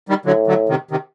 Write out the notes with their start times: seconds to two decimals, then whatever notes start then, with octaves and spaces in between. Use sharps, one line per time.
0.09 D#3 G3
0.25 A2 D3 F#3
0.47 D3 F#3
0.69 C3 D#3
0.91 C3 D#3